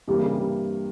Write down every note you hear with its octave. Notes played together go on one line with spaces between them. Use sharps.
G2 C3 E3 G3 A#3
C#3
C3